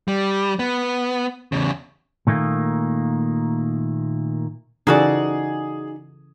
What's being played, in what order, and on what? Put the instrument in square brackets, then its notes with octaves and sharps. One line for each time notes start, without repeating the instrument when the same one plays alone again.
[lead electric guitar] G3
B3
E2 C#3
[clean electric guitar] A#2 D#3 A3 A#3
[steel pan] C#3 E3 A4 [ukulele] D#4 F#4 D5 [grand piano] G#4